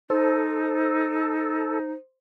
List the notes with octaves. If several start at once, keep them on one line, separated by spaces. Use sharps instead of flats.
D#4 A4 C5